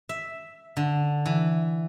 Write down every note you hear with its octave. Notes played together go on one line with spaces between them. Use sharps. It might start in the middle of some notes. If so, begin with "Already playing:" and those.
E5
D3
E3